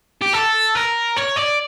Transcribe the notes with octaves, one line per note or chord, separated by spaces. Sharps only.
G4
A4
A#4
C#5
D5